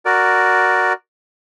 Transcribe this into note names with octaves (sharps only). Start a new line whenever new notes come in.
F#4 A#4 D5